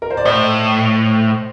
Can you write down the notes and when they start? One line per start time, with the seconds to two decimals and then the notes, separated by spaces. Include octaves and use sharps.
0.02 A#4
0.10 C5
0.17 D5
0.25 A2 C5 D#5